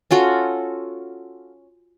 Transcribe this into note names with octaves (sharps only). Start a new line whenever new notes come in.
C#4 F4 F#4 A4